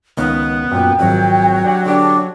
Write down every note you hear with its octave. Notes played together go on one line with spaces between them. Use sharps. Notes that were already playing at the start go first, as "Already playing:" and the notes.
C#2 D#3 B3
F#2 A#2 G5
G#1 F2 F#3
D4 G4 F#5
D3 D4 G4